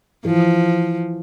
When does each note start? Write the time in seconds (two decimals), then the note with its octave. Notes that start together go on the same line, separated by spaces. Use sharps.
0.25 E3 F3